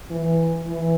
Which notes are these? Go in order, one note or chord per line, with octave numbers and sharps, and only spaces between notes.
E3
E3